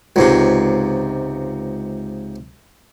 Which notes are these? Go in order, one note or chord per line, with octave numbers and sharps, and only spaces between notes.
C#2 G#2 C3